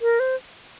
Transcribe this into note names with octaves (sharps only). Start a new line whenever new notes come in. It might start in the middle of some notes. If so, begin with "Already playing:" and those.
A#4
C5